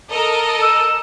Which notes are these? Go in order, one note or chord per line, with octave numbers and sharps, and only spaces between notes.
A4 A#4 D#5
E6